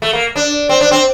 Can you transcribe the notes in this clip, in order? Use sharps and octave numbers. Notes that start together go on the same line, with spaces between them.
A3
A#3
D4
C4
D4
C4